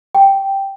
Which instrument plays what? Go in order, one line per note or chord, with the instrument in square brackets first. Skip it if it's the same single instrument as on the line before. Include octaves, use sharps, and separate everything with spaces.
[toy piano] G5